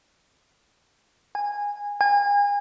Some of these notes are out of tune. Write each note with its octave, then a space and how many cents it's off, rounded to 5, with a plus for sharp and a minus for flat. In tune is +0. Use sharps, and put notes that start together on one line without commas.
G#5 -20
G#5 -35